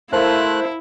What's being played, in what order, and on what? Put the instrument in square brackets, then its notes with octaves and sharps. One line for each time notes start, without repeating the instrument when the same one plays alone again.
[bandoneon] A3 F#6 [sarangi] E4 [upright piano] A#4 F5 A5 [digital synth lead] C5